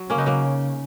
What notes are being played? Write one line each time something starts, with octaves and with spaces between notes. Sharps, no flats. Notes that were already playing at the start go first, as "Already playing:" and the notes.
Already playing: F#3
C#3 A#3 C#4
B3 D#4
F#3 A#3